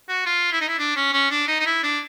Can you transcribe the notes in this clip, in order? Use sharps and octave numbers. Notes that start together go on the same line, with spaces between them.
F#4
F4
E4
D#4
E4
D4
C#4
C#4
D4
D#4
D#4
E4
D4